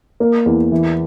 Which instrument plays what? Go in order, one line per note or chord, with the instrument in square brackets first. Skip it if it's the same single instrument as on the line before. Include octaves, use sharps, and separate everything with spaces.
[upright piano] A#3 A#4
E2
E3